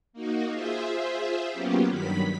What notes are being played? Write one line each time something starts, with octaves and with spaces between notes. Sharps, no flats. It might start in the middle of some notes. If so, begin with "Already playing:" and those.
A#3 D#4 F#4
F4 G#4 C5 E5
F#3 A#3 B3 C#4 F4 G4
G2 D#3 F#3 B5 B6